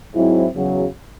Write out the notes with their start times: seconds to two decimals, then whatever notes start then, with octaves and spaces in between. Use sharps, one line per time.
0.14 G#2 F#3 C4 E4
0.54 E2 C#3 F#3